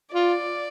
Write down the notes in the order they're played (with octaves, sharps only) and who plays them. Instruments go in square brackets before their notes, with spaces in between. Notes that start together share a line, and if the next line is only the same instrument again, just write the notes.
[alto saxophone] F4 [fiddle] D5